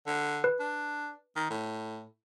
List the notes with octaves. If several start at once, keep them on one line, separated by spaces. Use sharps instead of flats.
D3
B4
D4
D#3
A2